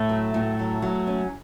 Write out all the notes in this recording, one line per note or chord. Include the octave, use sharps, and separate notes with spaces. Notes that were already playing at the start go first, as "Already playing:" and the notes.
Already playing: A2 A3
F#3
A2
F#3
F#3
C#4